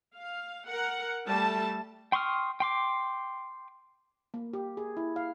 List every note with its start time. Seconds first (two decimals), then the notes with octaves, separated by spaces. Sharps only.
0.16 F5
0.69 A#4 F#5
1.28 G3 A3 A5
2.12 G5 C6 C#6 D#6 F6
2.60 G5 C6 D6
4.34 A#3
4.53 G4
4.77 G#4
4.97 E4
5.16 F5